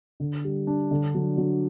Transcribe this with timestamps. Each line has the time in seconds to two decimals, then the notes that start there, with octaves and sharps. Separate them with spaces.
0.20 D3
0.44 G3
0.67 D4
0.91 D3
1.15 F#3
1.38 F#3